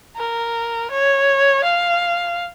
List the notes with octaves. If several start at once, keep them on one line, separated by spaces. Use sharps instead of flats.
A#4
C#5
F5